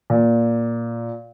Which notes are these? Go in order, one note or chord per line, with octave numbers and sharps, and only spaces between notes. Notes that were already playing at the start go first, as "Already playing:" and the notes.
A#2